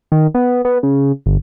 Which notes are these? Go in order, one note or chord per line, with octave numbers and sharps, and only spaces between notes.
D#3
B3
B3
C#3
G1